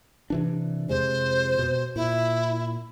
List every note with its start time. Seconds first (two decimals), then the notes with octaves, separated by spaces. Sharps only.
0.30 C3 E3 D4
0.89 F2 C3 G#3 C5
1.59 B2
1.96 A#2 E4